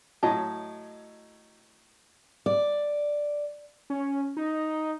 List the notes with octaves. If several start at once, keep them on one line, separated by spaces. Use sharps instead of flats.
A2 F#3 D#5 A5
D5
C#4
D#4